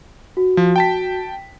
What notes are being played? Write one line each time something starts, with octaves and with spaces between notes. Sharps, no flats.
F#4
F3
G5 A5 B6